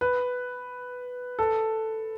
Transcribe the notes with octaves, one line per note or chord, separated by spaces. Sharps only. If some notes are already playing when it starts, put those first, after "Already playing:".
B4
A4